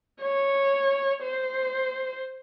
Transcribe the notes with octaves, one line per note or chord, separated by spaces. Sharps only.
C#5
C5